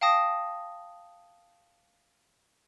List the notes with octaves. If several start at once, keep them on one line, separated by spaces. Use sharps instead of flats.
F5 G5 A5 D#6 A#6